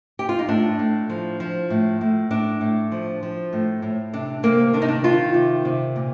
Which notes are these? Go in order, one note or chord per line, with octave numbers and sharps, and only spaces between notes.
G4
F4
D#4
A2 D4
A2
F3
F3
A2
A2
A2 D4
A2
F3
F3
A2
A2
C3 D4
C3 A#3
D#3 D4
D#4
D4
D#3 F4
C3
C3
A#2